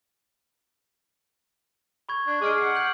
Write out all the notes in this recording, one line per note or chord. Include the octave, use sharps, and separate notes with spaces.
B5 C#6 G#6
D4
G#3 G#4 D#5 D6 F6 D7
F#5 C7
G6 F#7